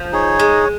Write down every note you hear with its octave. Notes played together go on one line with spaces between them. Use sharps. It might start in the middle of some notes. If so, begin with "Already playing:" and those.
Already playing: F3
D#4 G#4 C#5
G#3